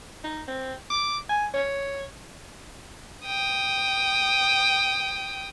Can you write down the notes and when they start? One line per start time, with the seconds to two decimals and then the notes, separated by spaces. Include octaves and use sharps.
0.24 D#4
0.48 C4
0.90 D6
1.29 G#5
1.54 C#5
3.26 G5 D#6